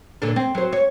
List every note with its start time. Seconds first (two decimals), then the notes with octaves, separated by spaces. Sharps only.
0.22 A#2 D3 D4
0.36 C4
0.55 F#3 C5
0.73 C#5